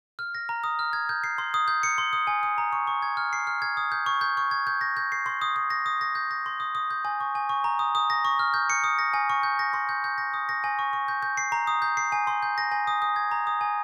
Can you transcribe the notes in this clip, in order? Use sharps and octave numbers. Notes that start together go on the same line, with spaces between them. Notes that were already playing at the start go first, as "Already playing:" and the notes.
F6
A#6
A#5
D#6
F6
G#6
G6
C7
C6
D#6
G6
C#7
C6
D#6
G#5
D#6
A#5
C#6
C#6
G#6
F6
C7
F6
G#6
D#6
G6
C#6
G6
C#6
G#6
G6
A#6
G6
C7
C6
D#6
D#6
A#6
D#6
A#6
G6
A#6
C6
D#6
D#6
G6
G#5
C#6
G#5
C#6
A#5
D#6
D#6
A#6
C#6
F6
G6
C#7
D#6
A#6
G#5
C#6
G6
A#6
C6
G6
G6
A#6
D#6
A#6
G#5
C#6
C#6
G6
G6
C7
A#5
D#6
G6
C7
G#5
C6
G6
A#6
G#5
D#6
D#6
G#6
A#5
D#6
G#5